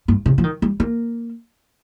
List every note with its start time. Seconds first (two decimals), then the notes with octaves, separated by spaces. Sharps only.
0.08 G2
0.26 C3
0.38 F3
0.44 D#3
0.62 G3
0.80 A#3